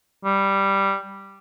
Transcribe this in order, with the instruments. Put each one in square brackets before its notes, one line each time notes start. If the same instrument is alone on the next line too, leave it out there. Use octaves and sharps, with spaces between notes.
[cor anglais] G3